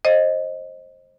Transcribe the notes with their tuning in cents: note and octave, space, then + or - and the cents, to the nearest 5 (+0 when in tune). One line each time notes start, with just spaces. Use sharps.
C5 +20 D#5 +0